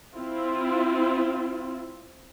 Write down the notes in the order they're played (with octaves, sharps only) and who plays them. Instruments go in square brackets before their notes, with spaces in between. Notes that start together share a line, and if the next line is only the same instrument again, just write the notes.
[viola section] C4 E4 F4